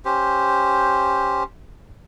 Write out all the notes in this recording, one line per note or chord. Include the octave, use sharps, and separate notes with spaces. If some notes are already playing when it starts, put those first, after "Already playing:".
C#4 G4 C5